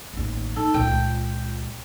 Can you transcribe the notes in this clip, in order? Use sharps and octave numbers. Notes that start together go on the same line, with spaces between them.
A1 D#2
D#4 A4
C#2 A#2 G5